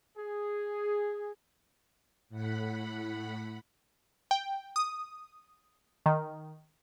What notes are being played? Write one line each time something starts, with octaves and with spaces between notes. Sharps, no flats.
G#4
A2 F#5 B5
G5
D#6
D#3